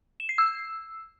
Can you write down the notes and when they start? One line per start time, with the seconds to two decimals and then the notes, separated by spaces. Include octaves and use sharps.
0.20 E7
0.29 C7
0.38 E6